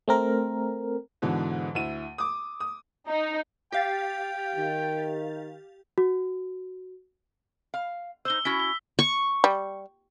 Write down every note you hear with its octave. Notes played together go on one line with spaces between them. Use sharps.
A3 C4 A#4
G#2 B2 D3 E3
D2 E4 D#7
D6 D#6
D#6
D#4
G4 F5 G5 A6
D#3
F#4
F5
D#4 C5 E6 G7
C#4 E4 F#4 B6
G7
C#6
G3